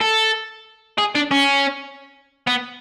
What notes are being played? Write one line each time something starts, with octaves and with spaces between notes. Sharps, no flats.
A4
G#4
D4
C#4
B3